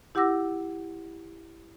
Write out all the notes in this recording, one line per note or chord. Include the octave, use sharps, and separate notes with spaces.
E4 G4 F#5 D6 E6 A#6